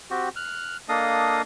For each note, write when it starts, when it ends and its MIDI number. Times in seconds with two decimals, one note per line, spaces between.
0.10 0.29 60
0.10 0.29 66
0.10 0.29 67
0.36 0.77 89
0.36 0.77 90
0.89 1.42 58
0.89 1.42 62
0.89 1.42 69
0.89 1.42 75
0.89 1.42 77
0.89 1.42 87